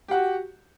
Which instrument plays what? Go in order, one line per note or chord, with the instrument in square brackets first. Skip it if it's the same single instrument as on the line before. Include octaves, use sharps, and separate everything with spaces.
[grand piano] G4
F#5
F#4